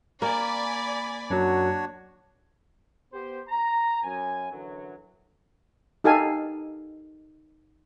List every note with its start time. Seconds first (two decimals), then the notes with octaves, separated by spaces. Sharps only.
0.22 A#3 D5 G#5 B5
1.30 F#2 F#3 D4 F#4 C#5
3.13 B3 G4 C5
3.49 A#5
4.03 F#2 G#5
4.52 F#2 D3 E3 F#3
6.04 D#4 G4 A4 F5 G#5